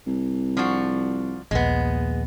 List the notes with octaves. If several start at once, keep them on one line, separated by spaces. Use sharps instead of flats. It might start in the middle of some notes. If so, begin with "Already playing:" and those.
C2
F3 D4 F#4
A#1 D#2 G#3 B3